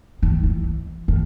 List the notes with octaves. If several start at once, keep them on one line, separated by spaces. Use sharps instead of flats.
D#3
E3
D#3